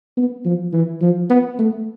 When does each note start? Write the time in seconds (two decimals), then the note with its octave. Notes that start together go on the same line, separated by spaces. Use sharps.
0.17 B3
0.45 F3
0.73 E3
1.01 F3
1.30 B3
1.59 A3